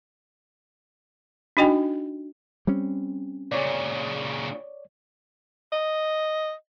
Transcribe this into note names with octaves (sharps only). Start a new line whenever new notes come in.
D4 D#4 F#4 D#5 G5 G#5
G3 C4 C#4
A#2 C#3 C#5 D5
D#5